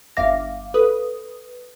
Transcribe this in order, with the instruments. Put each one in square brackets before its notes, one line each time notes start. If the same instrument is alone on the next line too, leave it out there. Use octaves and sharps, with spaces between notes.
[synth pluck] G1 F5 D6 [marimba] E5 A#6
[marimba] A4 [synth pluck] B4 D#6